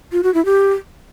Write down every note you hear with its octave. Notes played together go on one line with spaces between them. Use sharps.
F4
F#4
E4
G4